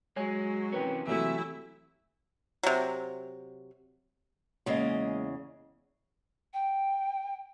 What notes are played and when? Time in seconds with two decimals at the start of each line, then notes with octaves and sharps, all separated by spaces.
0.16 F#3 G#3 C#5 G#5
0.73 C3 E3 C#4 A#4 B4 G5
1.07 C3 E3 F#3 A3 E4 G4 E5
2.63 C3 F#3
4.66 E2 C#3 G#3 A#3 D#5
6.53 G5